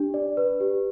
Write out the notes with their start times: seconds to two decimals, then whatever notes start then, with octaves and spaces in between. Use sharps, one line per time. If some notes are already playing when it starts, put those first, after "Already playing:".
Already playing: D4 G4
0.14 D5
0.37 B4
0.60 G4